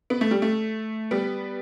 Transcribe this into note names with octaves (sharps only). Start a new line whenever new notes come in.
B3
A3
G3
A3
G3 B3